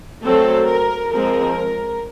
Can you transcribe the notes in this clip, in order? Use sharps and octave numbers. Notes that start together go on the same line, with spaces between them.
F#3 A3 C4 A4
A#4
F3 G#3 C4 A#4